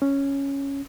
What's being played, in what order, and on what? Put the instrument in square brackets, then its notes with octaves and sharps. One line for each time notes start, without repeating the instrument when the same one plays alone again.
[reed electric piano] C#4